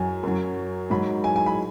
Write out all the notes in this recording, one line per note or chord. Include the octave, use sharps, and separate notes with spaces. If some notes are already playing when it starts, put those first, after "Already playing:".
Already playing: F#2 F#3 G#5
F#2 F#3
G#2 F#3 B5
G#5
G#5
B5